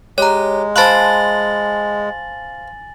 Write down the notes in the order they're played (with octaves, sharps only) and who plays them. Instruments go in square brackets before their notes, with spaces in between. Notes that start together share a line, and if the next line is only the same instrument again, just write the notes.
[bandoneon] G#3 [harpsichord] G4 [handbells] C#5 A#5
[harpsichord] F4 C5 [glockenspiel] G#5 A6 F#7 [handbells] A5 B5 F#6